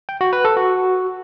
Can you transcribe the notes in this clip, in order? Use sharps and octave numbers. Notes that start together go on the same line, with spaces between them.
G5
F#4
B4
A4
F#4